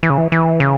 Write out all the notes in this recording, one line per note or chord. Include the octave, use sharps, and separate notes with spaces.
E3
C#3
E3
E3
C#3